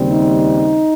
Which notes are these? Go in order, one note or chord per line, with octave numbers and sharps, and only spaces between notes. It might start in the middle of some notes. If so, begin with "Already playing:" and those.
Already playing: D#2 C#3 G3 C4
D#4